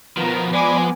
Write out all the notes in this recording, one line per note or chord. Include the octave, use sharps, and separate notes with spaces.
B2 D#3 F3 B3 A#4
G#3 D5 G#5 B5 D6